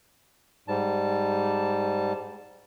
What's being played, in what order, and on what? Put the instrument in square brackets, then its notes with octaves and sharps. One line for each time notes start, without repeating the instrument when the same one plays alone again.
[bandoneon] G#2 G3 A5